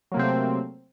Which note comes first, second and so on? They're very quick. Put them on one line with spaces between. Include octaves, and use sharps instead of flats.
F#3 A#3 C3 C4 A3